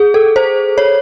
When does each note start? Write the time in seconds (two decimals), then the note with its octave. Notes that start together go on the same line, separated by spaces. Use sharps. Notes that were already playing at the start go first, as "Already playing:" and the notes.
Already playing: G#4
0.14 A4
0.36 C5
0.78 C#5